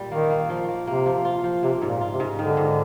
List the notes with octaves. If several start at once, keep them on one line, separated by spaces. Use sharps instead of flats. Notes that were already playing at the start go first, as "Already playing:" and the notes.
Already playing: A#2 G3
D#3 A#3
A#3
F3
A#3
C3 A#3
F3
F4
F3
C3 A#3
G#2
A#2
F4
C3
G#2
D3 D#3
G#2